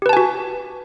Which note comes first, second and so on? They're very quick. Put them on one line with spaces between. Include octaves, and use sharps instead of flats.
G4 B4 A5 G#5 F#4